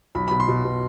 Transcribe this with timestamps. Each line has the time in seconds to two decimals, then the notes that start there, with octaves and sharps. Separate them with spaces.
0.15 B1 B5
0.28 B2 B5
0.40 C6
0.48 B2
0.64 B2